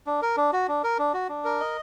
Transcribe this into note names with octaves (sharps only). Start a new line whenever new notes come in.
D4
A#4
D4
F#4
D4
A#4
D4
F#4
D4
A#4
D#5